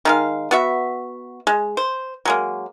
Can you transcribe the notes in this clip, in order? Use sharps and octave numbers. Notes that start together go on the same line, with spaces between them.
D#3 G#3 F5
B3 F#4 E5
G#3
C5
F#3 G#3 A#3